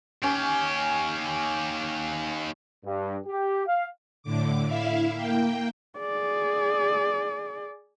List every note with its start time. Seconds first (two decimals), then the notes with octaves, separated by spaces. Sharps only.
0.23 D#2 C#4 G4
2.84 G2
3.26 G4
3.66 F5
4.23 A2 D3 D6
4.66 E4 E5 F5
5.13 A#3 G5
5.99 G#4 D5